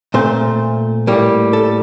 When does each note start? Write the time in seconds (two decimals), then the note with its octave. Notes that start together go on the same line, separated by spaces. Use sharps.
0.14 A#2 A3 C4 C5
1.07 A2 G3 A#3
1.53 A4